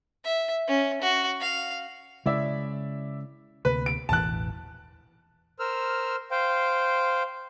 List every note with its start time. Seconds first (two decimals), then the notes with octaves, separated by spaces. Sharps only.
0.24 E5
0.67 C#4
1.01 F#4
1.40 F5
2.26 C#3 G#3 E4 D5 E5
3.65 D2 C3 A#3 B4
3.86 D7
4.09 E1 A1 E3 A5 F#6
5.59 A#4 C5 E6 F6
6.31 C5 F5 G5